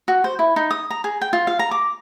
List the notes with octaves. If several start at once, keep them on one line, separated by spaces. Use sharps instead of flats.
F#4
C5
E4
D#4
D#6
A#5
G#4
G5
F4
F5
A#5
D6